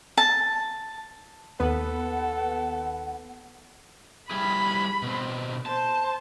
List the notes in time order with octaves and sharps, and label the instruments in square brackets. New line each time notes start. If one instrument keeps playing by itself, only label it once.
[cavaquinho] A5
[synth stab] D#2 B3 B4 [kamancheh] A4 [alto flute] F#5
[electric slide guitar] G3 E4 G#4 [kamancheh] B5
[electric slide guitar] B2 C4
[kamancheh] C5 [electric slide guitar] A5